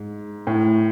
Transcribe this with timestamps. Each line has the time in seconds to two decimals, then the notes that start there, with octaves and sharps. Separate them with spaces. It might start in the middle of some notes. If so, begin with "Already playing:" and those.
Already playing: G#2
0.47 A2